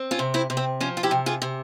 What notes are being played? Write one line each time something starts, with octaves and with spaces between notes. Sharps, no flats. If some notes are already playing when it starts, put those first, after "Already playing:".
Already playing: C4
C#4 F4
C3
C4 E4
C3
C4
F3 C#4
F4
E4 G4
C3
F4 G#4
C3